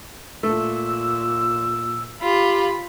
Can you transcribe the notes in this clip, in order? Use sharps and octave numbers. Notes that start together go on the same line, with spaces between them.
A#2 A3 E6
F4 G4 B5